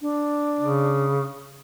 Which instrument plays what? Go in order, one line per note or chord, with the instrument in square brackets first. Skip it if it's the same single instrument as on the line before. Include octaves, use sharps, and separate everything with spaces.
[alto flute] D4
[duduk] C#3